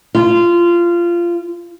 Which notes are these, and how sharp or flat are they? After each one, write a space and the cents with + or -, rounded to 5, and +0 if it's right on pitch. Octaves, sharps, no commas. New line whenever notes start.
F4 -20